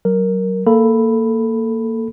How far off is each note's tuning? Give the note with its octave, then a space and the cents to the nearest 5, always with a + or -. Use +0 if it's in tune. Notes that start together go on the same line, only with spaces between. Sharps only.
F#3 +25 A#4 +0
A#3 -15 A4 +0 B5 +0